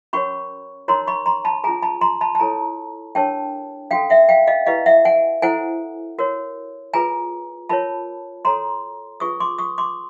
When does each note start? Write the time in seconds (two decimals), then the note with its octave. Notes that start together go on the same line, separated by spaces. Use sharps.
0.13 C#4 F#4 A#4 C#5 B5 C#6
0.88 D#4 F#4 A#4 C#5 A#5 C6
1.07 B5 C#6
1.26 A#5 C6
1.45 A5 B5
1.64 G#4 G#5 A#5
1.67 C#4 F4
1.83 A5 B5
2.01 A#5 C6
2.21 A5 B5
2.35 A5
2.40 E4 A4 C#5 G#5 A#5
3.15 D4 G4 A#4 C#5 G5 A5
3.91 C#4 F#4 A4 F5 G5
4.10 E5 F#5
4.29 F5 G5
4.47 D#5 F5
4.66 E4 G4 B4 D#5 F5
4.86 E5 F#5
5.05 F#5 G#5
5.42 E4 A4 C5 F#5 G#5
6.19 F#4 A#4 C#5
6.94 F4 G#4 B4 G#5 A#5
7.69 F4 A#4 C#5 A5 B5
8.45 F#4 A4 C#5 A#5 C6
9.20 C#4 F4 G#4 B4 C#6 D#6
9.40 C6 D6
9.58 C#6 D#6
9.78 C6 D6